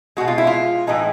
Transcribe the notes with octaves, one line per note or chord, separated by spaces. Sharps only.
B2 G#3 F#4
F4
E4
F4
A2 E3 G#3 D#4